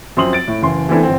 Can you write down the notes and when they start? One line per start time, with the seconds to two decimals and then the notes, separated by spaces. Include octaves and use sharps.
0.17 F#2 F3 C4 C6 D#6 F#7
0.33 A6 D7
0.48 A2
0.62 F#1 E3 C6
0.89 E3 A3 B3 C4 D4 E4
1.03 G1 C4